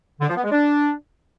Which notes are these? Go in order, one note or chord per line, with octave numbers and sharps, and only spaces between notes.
D3
F3
B3
G#3
D4